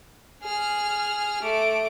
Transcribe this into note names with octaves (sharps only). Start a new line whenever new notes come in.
G#4 F6
A3 D6